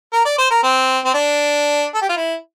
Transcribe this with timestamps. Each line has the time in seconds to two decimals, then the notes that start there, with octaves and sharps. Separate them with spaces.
0.13 A#4
0.25 D5
0.38 C5
0.51 A#4
0.63 C4
1.05 C4
1.14 D4
1.95 A4
2.02 G4
2.09 F4
2.16 E4